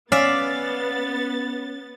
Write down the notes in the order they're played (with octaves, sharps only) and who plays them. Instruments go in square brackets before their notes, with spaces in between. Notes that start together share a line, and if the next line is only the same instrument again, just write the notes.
[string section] B3 A6 [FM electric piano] C#4 [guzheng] D5 E5 F5